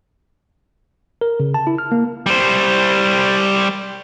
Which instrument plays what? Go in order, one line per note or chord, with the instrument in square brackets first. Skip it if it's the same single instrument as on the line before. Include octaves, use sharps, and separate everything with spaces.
[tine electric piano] A#4
C#3
A5
E4
F6
A#3
[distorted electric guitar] G3 C5